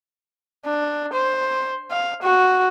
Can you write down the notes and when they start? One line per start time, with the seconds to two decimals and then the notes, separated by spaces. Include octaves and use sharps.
0.66 D4
1.14 C5
1.91 F5
2.22 F#4